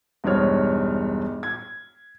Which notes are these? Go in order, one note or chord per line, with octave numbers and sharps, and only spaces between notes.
E1 G2 D#4 C5 C#5 F6
G#6